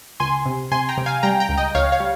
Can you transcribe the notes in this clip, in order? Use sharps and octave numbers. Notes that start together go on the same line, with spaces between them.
C#2 G#5 C6
C3
C3 G#5 C6
G5 A#5
C3
F5 G#5
G3 G5 A#5
G5 A#5
C#2
D#5 G5
C#2 C#5 F5
C#5 F5
G3